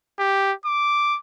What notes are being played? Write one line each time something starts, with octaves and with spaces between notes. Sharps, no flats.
G4
D6